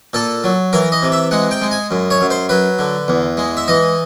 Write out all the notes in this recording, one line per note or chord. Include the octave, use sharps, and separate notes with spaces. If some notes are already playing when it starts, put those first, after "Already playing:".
A#2 A4
F#3
E3 A#4
D#5
C3
E5
G#3 F#5
G5
G#3
G#5
F#2
C#5
F#2
C5
F#3 B4
D3
E2
G#3
E5
E3 D#5